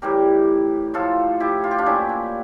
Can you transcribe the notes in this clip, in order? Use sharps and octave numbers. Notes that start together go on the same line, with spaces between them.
A2 E3 G3 G4 A#4
A2 F3 F4 A4
E4 G4
F4
G4
D4 F4
A#2 F3 C#4 E4
D4